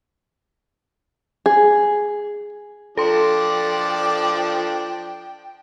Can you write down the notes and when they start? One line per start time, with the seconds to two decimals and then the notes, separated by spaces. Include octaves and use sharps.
1.46 G#4
2.97 F3 D4 A4 D5 G5 C6